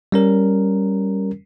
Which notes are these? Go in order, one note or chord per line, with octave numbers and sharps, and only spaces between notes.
G3 C#4 A#4